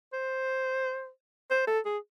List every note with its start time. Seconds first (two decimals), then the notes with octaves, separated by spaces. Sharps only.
0.13 C5
1.51 C5
1.67 A4
1.86 G#4